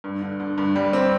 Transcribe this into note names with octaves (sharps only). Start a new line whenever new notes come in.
G2
D3
D3
G2
G3
C4